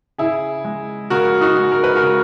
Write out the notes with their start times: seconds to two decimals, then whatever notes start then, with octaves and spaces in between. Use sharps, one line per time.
0.18 C#3 E4 G#4
0.65 G#3
1.10 C#3 F#4 A#4
1.41 D#4 F#4
1.57 G#3
1.72 A#4
1.84 B4
1.95 F#4 A#4
2.03 C#3